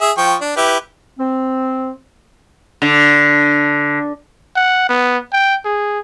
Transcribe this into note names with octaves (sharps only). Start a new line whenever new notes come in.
G#4 E5
F3 G5 C#6
D4
E4 G4 B4
C4
D3
F#5
B3
G5
G#4